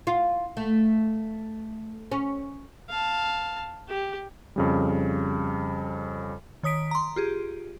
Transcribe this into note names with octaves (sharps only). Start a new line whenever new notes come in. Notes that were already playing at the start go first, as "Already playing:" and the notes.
F4
A3
C#4
F5 A5
G4
F2 C#3 G3
D#3 C#5 D#6 B6 D7
A#5 C6
F4 G4 G#4